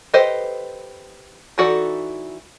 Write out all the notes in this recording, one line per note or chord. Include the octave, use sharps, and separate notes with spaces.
G4 A4 B4 C5 D#5
E3 D#4 F#4 A4 D5